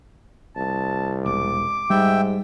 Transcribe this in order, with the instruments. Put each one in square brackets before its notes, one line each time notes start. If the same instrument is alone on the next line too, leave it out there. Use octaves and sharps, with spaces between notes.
[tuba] C2 [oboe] A5
[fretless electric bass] E1 [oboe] D6
[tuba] G#2 [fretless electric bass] G3 [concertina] E5 G5